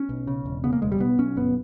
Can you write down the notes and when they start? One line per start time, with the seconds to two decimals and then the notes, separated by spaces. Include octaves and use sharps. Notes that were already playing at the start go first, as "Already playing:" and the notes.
Already playing: C#4
0.09 B1
0.27 C#3
0.45 E1
0.64 C#3 B3
0.73 A#3
0.82 E1 G#3
0.92 G3
1.00 B1 B3
1.18 B1 C#4
1.36 G1 B3